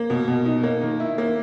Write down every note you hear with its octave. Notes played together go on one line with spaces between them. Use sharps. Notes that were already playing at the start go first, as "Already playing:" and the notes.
Already playing: A#3
B2
B2
D#4
A#3
D#3
E4
A#3